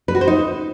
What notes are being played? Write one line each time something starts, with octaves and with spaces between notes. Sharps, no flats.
B4
F#4
C5
D#4